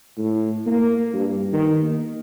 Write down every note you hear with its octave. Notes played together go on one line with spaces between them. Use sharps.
A2
A#3
G2
D#3
A#3